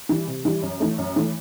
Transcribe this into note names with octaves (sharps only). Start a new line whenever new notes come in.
E3 G3
C3
E3 G3
F#2
E3 A3
F#2
E3 A3